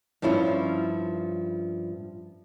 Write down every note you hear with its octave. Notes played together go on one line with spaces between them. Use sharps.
G2 F3 C#4 E4 F4